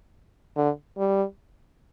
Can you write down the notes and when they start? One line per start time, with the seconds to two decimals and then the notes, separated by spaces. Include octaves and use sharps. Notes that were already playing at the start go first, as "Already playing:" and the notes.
0.57 D3
0.98 G3